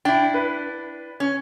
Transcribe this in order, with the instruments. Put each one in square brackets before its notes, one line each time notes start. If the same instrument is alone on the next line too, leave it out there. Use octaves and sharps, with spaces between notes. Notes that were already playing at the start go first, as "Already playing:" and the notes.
[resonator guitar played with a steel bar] D4 E4 [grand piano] G5
[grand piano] B4
[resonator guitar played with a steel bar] C#4